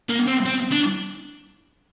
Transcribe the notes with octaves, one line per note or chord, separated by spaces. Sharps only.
A#3
C4
C4
D4